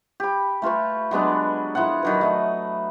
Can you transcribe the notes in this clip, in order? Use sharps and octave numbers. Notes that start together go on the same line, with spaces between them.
G4 B5
A3 F4 B4 C#6
F#3 G#3 B3 D4
F3 E4 A4 F#5
D#3 F#3 B4
A3 D#5